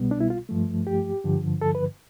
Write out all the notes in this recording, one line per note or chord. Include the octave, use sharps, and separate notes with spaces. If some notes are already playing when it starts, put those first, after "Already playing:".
Already playing: C2 B2 G3 B3
D4
E4
F4
G2 F3 A3
G4
G2 D3 F3
A4
B4